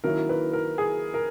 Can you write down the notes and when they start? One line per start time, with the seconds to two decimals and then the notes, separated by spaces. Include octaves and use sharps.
0.04 D#3 F#3 A#3 C#4 E4 A#4
0.29 B4
0.53 A#4
0.78 G#4
1.14 A#4